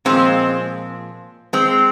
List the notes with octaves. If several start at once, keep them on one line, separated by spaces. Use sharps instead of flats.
A#2 F3 G#3 C4
G#3 C4